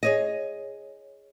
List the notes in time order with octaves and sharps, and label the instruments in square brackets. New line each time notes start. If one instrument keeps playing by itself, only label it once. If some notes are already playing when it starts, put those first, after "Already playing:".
[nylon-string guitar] G#4 C#5 D#5